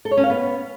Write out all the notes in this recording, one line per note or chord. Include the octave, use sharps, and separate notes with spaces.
A4
C#5
C#4
F5
B3